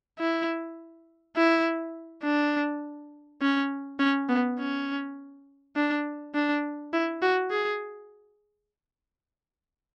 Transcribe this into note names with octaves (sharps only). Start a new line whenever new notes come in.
E4
E4
D4
C#4
C#4
B3
C#4
D4
D4
E4
F#4
G#4